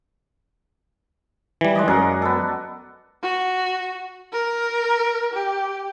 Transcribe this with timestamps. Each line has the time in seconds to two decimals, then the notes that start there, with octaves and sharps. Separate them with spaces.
1.61 E3 G3
1.75 G#3 D5 D#5
1.88 F#2 G#4 A#4 F#5
2.22 B3 A4
3.23 F#4
4.32 A#4
5.34 G4